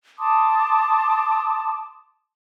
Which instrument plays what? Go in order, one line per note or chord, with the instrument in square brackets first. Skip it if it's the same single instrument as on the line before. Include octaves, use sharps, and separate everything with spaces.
[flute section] A5 C6 D6 D#6